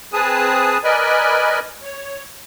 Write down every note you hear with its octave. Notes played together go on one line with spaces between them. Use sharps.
C4 G#4 B4 G#5 A5 D#6
A#4 B4 D5 D#5 G#5 B5
C#5